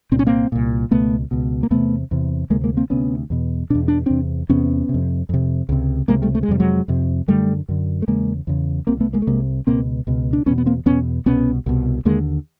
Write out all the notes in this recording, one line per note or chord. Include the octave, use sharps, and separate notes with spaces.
C2 A#2 C4
C#4
A#3 C4
C2 A#2
C#2 B2 A3 B3
C#2 B2
A#3
E2 C3 A3 B3
E2 C3
D2 C3 G#3 A#3
G#3 A#3
A#3 C4
D2 C3 B3 C#4
E2 B2
E2 B2 D4
D4
E2 C3 C4 D4
E2 C3 B3 C#4
C3
F2
F2 C3
C#2 C3
C#2 C3 G#3 A#3
G3 A3
A3
G#3
F2 C3 G3
F#3 G#3
F2 C3
F#2 D3 G3 A3
F#2 D3
A3
E2 C#3 G#3 A#3
E2 C#3
C2 C3 A#3 C4
A3 B3
G#3 A#3
A3
C2 C3 G#3 A#3
C#2 B2 A#3 C4
C#2 B2
D4
E2 B2 B3 C#4
B3
A#3 C4
E2 B2 B3 C#4
C2 B2 B3 C#4
C2 B2
D#2 D3 G#3 A#3